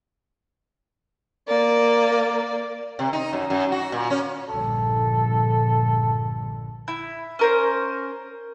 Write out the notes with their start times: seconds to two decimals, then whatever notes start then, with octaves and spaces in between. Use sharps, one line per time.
1.48 A#3 D5
2.99 C3
3.13 D#4
3.33 F#2
3.50 F#2
3.72 F#4
3.92 A#2
4.10 C#4
4.49 A#1 G2 D3 A4
6.88 E4
7.39 C#4 A#4 C5